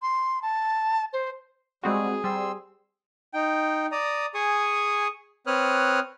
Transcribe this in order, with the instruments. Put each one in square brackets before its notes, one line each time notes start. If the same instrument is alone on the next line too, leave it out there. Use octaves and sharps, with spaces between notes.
[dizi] C6
A5
C5
[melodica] G3 [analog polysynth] G#3 C4 F#4 [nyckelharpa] G#4
[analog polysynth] G3 [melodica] C4 C6 E6
[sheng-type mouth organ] D#4 G5
D5 A#5 D#6
G#4 G#5 C#6 D#6
C4 B4 C#5 D#6 F6 F#6